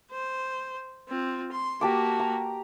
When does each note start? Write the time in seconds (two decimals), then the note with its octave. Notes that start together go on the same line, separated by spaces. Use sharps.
0.11 C5
1.08 C4 F4
1.52 C6
1.81 A#3 F#4 G4 A5 D6
2.20 A#5